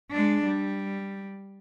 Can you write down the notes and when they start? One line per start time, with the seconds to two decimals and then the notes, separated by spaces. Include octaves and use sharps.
0.11 G#3 D4
0.44 G3